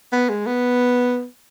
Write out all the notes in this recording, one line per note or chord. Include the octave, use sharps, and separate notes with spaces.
B3
G#3
B3